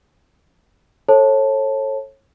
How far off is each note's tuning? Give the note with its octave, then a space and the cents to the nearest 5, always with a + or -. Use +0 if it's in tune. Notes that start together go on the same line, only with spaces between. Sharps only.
A4 +0 C#5 -30 A5 +0